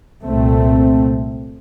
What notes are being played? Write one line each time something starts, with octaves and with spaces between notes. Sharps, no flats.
C2 A#2 A3 C4